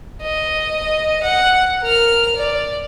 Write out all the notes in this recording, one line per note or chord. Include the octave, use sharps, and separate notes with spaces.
D#5
F#5
A#4 F6
D5